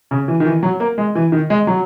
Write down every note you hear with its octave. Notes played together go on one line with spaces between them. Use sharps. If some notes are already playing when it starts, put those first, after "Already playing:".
C#3
E3
D#3
E3
F#3
A#3
G#3
E3
D#3
G#3
F#3